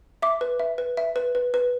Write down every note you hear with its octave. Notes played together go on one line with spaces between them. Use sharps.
E5 D6
B4
E5
B4
E5
B4
B4
B4